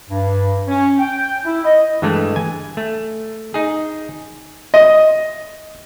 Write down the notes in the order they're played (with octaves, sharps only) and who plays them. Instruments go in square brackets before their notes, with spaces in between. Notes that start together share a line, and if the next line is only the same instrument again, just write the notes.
[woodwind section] G2
C#4
G5
E4
D#5
[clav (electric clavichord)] G2 E3 G#3 A3
G#5
A3
D#4 G#4
[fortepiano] D#5